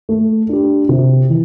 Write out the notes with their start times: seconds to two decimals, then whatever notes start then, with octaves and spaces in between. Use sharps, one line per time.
0.09 A3
0.49 D4 G4
0.89 C3
1.30 E3